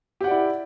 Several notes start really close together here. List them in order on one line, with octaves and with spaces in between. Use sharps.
G4 F#5 D5 E4